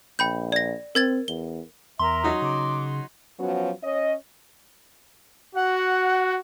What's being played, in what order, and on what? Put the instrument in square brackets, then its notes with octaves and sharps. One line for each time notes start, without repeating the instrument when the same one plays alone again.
[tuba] A#1 [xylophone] G5 B5 G6
[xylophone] D5 A#6
[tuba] C4 [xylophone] A#4 G#6 A6
[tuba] E2 [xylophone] G7
[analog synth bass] E2 [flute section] A#4 E5 A#5 [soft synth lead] C6
[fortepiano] F#3 D#4 F#4
[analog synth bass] C#3 [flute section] D6
[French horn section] F3 F#3 B3 C#4 F#4
C#4 C#5 D#5
[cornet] F#4 [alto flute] F#5